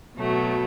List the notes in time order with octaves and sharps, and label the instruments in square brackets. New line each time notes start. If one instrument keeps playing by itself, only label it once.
[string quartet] B2 F#3 A3